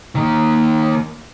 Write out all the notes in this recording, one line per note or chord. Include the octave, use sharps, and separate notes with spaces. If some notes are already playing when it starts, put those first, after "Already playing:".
D#3 A#3